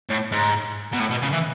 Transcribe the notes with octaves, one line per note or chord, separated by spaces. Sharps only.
A2
G#2
B2
A2
B2
C#3
E3